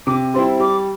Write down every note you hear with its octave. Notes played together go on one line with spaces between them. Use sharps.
C3 D6
G3 C4 E4 C6
G3 D6